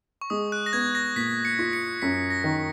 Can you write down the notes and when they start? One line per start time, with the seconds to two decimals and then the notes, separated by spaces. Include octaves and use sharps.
0.21 C#6
0.30 G#3 D#6
0.52 F#6
0.66 A#6
0.73 B3 G#6
0.95 A#6
1.16 A#2 B6
1.45 C#7
1.59 F4
1.73 C#7
2.02 F#2 B6
2.30 A#6
2.44 D#3